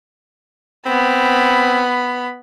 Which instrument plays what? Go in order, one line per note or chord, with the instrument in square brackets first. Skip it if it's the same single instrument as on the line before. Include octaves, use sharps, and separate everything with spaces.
[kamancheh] B3 B5 [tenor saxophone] C4